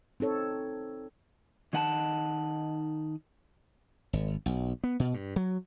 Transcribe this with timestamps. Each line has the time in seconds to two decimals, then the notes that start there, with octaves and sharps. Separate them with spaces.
0.20 C4 D#4 A4 C#5
1.73 D#3 D#4 F#5 G#5 A5
4.13 G#1
4.46 B1
4.84 B3
5.00 B2
5.14 G2
5.36 F#3